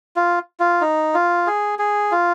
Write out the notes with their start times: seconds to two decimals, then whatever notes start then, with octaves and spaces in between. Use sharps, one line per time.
0.16 F4
0.60 F4
0.81 D#4
1.14 F4
1.47 G#4
1.79 G#4
2.12 F4